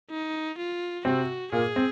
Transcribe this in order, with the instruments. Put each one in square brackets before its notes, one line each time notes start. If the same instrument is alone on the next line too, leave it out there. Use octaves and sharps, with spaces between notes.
[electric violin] D#4
F4
[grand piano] C3 C4 [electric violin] F#4
[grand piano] A#2 A#3 [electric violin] G#4
[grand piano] C4